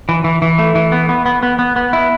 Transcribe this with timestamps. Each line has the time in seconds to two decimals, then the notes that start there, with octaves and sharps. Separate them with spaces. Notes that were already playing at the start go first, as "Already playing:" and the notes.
0.09 E3
0.24 E3
0.42 E3
0.58 A3
0.75 E3
0.92 B3
1.09 B3
1.26 B3
1.43 B3
1.59 B3
1.76 B3
1.93 E4